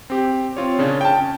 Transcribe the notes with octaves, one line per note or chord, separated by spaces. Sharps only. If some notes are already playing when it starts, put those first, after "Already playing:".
C4 G4
C4 F4 C#5
A#2 C#3 C#4 D4
G5 A5
C#4